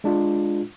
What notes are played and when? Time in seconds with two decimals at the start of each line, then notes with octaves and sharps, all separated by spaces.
0.04 G#3 D4 F4